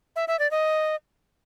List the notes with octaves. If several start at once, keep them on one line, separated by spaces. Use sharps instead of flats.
E5
E5
D5
D#5